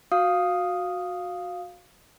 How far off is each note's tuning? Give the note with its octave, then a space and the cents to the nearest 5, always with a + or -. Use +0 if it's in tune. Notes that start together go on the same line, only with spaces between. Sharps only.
F#4 -20 F5 +0 D#6 +0